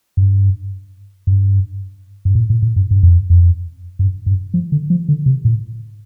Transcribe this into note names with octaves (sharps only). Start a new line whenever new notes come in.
G2
G2
G2
A2
A2
A2
G2
G2
F2
F2
G2
G2
F3
D3
F3
D3
C3
A2